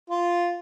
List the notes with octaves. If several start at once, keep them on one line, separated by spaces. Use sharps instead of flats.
F4